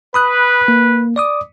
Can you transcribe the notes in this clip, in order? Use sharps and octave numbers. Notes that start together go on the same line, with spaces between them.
B4 B5 D#6 F#6
A#3
D5 D6 D#6